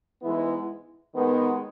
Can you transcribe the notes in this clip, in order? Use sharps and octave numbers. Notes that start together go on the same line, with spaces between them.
G#2 E3 G#3 B3 E4
D#2 D#3 G#3 B3